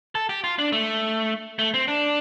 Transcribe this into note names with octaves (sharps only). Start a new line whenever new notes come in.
A4
G4
F4
D4
A3
A3
C4
D4